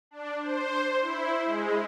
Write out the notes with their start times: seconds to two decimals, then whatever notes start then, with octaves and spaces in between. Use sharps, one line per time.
0.11 D4
0.40 C5
1.02 E4
1.44 G#3